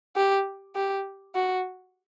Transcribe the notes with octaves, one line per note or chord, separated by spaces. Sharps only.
G4
G4
F#4